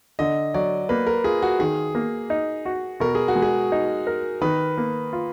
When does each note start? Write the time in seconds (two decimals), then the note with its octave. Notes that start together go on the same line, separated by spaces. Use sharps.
0.19 D3 D#5
0.54 F#3 D5
0.89 A#3 B4
1.07 A#4
1.24 F4 G#4
1.42 F#4
1.59 D#3 G#4
1.95 A#3
2.30 D#4
2.65 F#4
3.00 B2 A#4
3.15 G#4
3.28 F#4
3.36 G#3
3.42 G#4
3.72 D#4
4.07 A#4
4.41 D#3 B4
4.78 A#3
5.13 F4